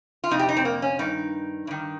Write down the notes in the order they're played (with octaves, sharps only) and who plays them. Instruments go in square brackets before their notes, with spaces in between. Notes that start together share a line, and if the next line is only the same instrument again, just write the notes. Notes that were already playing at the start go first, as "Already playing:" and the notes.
[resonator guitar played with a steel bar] F4
F2 C3 D#4
G4
D#4
C4
A#3
C#4
G2 D#3 D#4
G2 D#3